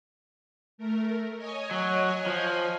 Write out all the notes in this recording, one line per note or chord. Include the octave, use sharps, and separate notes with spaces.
A3 A#4
C#5 D#5 G#5
F#3
F3